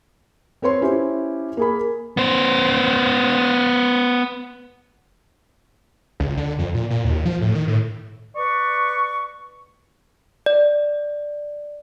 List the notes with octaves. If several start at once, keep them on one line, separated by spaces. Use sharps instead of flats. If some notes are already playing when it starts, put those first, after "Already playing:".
C4 B4 C#5 C6
C#4 E4 G4 C5
A#3 G#4 B5
B3 C5
C#2
D3
F2
A#2
A#2
D#2
F3
A2
D#3
A2
B4 D5 C#6
D5